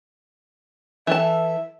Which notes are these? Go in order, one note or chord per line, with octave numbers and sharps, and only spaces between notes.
E3 A4 E5 A5